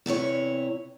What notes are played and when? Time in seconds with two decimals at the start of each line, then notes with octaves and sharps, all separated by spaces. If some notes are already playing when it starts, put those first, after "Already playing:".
0.06 E2 C3 E4 C#5